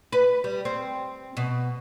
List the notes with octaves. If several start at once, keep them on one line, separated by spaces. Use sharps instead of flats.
B4
G3
C4
B2